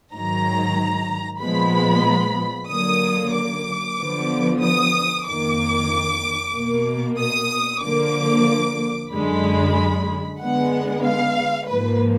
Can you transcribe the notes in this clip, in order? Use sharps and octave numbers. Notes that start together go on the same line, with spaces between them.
G#2 D#3 F#3 A#5
A#2 F3 G#3 B3 B5
D3 F#3 A#3 D#6
D6
D3 F3 B3
D#6
F2 D#3 A#3 D6
B2 A#3
D#6
D3 F3 A#3 D6
F#2 D3 G#3 B5
D3 G#3 B3 F#5
F5
G#2 F3 A#3 B4